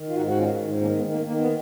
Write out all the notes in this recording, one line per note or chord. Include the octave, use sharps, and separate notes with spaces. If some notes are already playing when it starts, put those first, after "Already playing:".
Already playing: D#3
F4
G#2 D#4 F#4
F#4
D#3 C#4 F4
G#2
D#3 A#3 C#4
G#3 B3
D#3
A#3
D#3 A#3
B3